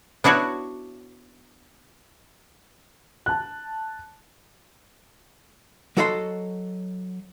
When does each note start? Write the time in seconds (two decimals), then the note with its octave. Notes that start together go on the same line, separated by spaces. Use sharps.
0.24 B3 D4 E4 F#4 C#5
3.26 A5 F#6
5.97 F#3 F#4 A4 D#5 F#5 C6